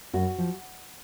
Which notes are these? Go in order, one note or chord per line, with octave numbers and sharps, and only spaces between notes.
F#2 F#4
F3